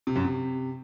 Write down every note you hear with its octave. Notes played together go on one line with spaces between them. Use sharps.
C3
F#2
C3